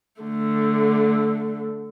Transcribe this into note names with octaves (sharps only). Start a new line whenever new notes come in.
D3 A3